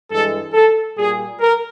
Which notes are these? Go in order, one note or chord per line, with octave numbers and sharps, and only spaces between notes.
G2 E3 G#3 A4
A4
A#2 G3 G#4
A#4